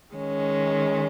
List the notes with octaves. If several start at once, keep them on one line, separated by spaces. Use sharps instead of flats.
D#3 G#3 C#4